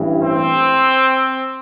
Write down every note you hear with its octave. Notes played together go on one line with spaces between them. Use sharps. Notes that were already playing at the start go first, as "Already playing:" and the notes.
Already playing: A1 G2 E3
C4 C5